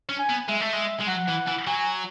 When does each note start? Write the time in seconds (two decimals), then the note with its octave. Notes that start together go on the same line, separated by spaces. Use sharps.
0.09 C#4
0.19 G#5
0.29 B3
0.48 G#3 E5
0.60 A3
0.73 G#3
1.00 G#3
1.07 F#3 F#5
1.28 E3
1.47 E3
1.66 F#3 G#5